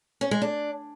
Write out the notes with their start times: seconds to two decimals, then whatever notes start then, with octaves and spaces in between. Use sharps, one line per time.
0.21 C#4
0.31 G#3
0.42 D4